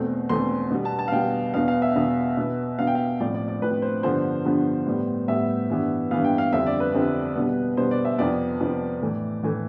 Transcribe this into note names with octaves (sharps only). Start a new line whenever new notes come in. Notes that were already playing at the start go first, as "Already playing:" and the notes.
Already playing: E2 B2 A3 C4
E2 B2 A3 C4 C6
B2 G3 B3
A5
A5
F5
B2 G3 B3 G5
E2 B2 B3 F5
F5
E5
E2 B2 B3
B2 B3
B2 B3 F5
G5
F5
A2 F3 C4 D5
D5
D5
A2 F3 C4 B4
C5
G2 D3 F3 B3 C5
G2 D3 F3 B3
A2 G3 B3
A2 G3 B3 E5
G2 E3 B3
G2 E3 B3 F5
G5
F5
F2 D3 G3 C4 E5
D5
B4
F2 D3 G3 C4
B2 G3 B3
B2 G3 B3 C5
D5
E5
F2 C3 F3 B3 D5
F2 C3 F3 B3
A2 E3 A3
A2 E3 A3